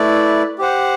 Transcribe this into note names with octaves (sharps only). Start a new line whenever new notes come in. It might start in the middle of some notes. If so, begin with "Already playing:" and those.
Already playing: A3 E4 B4 D5
G4 C5 F#5